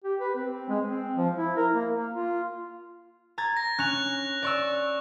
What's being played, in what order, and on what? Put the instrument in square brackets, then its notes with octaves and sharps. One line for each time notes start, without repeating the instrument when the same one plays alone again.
[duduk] G4
B4
C4
G#3
C4
F3
E4
A#4
A#3
A#3
F4
[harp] A#5 G#6 A6
[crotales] A#6
[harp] C#4 [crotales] F#6 F7
[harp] D5 C#6 E6